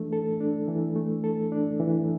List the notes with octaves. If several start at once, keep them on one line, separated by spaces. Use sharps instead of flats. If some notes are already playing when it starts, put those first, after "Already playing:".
Already playing: E3 A3 D4 A4
A4
D4
E3
A3
A4
D4
E3